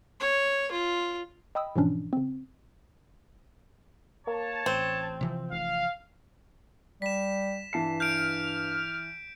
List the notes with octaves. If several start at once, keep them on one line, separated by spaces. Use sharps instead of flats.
C#5
F4
D#5 G5 B5 D#6 E6
G#2 B2 E3 F3 C#4 D4
C#3 C4
A#3 C#5 A5
A1 C4
C3 E3 F3
F1 F5
G3 B6 E7
G2 E3 A5 C7
F6 G6 D7